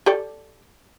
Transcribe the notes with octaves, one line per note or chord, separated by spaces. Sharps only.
G4 A4 D5